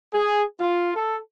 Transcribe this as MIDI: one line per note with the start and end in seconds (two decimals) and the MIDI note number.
0.13 0.43 68
0.60 0.92 65
0.96 1.17 69